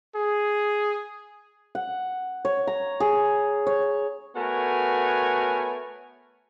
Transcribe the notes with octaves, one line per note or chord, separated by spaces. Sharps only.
G#4
F#5
C#5
A#5
G#4
C#5
A3 B3 F#4 A#4 C#5 G#5